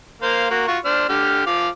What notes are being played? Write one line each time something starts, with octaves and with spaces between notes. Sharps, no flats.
A#3 C5 F5
A#3 F#4
F4 F#4 C#6
D4 C5 F6
D3 G4 F6
F3 F5 D6